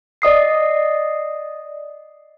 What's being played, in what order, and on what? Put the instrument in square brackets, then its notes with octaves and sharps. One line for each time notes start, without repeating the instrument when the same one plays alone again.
[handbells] D5 D#5 D#6 C7